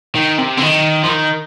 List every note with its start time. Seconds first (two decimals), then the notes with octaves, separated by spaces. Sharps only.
0.15 D#3
0.39 C3
0.58 D3
0.62 D#3
1.03 F3
1.09 D#3